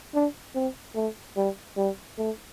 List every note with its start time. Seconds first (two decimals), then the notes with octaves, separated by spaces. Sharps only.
0.14 D4
0.55 C4
0.95 A3
1.37 G3
1.77 G3
2.18 A3